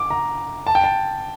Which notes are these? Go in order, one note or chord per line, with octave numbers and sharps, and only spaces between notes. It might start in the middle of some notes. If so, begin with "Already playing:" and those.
Already playing: D6
A#5
A5
G5
A5